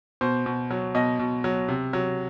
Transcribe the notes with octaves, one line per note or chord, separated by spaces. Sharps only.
B2 C5
B2
F#3
B2 D#5
B2
F#3
C3
F#3